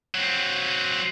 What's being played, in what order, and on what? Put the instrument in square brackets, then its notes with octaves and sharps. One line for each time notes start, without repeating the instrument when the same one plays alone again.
[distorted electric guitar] F#3 C4